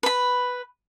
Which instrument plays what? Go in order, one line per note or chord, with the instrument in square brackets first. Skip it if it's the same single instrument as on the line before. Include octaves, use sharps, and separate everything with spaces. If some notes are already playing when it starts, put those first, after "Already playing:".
[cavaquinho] B4 B5